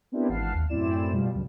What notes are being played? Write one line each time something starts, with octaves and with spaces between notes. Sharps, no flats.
B3 C4 D4 E4 G4 A#4
G#1 E3 F5 F#5 A5 C7
D#2
F#2 A2 C4 E4 D5 E7
B2 G3 F4
C#2 G2 F#3